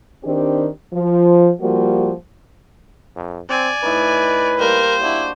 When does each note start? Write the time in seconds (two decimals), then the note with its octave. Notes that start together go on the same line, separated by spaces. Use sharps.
0.25 D#3 C4 D4 G4
0.93 F3
1.61 F3 G3 A#3 F#4
3.16 F2
3.49 C4 D5 G#5
3.83 A2 D#4 B4
4.59 G3 A#3 A#4 C5 A5
5.00 D4 E4 F#4 D5